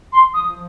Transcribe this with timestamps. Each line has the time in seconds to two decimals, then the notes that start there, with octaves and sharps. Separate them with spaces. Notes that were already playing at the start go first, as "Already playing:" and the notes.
0.13 C6
0.34 F3 D#6